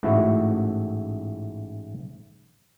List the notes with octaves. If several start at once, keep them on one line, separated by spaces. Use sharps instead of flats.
A1 G#2 A3 E4 F#4